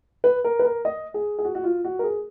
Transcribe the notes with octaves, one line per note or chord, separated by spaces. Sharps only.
B4
A#4
B4
A#4
D#5
G#4
G#4
F#4
F#4
F4
F#4
A#4
G#4